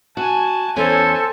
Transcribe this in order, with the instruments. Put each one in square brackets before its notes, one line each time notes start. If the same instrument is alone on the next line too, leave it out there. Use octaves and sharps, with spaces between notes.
[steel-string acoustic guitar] F#4 [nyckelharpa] G#5 A5
[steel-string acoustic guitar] E2 C#4 [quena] A4 [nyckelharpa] C5 G#5